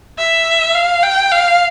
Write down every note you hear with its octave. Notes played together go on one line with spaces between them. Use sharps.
E5
F5
G5
F5